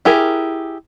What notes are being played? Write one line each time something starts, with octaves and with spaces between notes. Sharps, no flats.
E4 G4 G#4 A#4